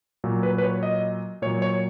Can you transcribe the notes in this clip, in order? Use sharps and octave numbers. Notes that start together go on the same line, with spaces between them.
A#2 F#3
B4
B4
C#5
D#5
A#2 F#3 C#5
C#5